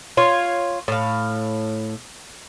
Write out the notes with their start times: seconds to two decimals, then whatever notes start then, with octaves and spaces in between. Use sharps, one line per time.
0.17 F4 C#5
0.88 A2 F5